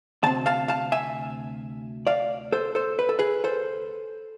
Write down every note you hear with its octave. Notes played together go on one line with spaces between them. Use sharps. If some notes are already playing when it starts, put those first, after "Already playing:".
D2 C3 C4 A5
F5 A5
F5 A5
E5 G#5
D5 F5
A4 C5
A4 C5
B4
A4
G#4 B4
A4 C5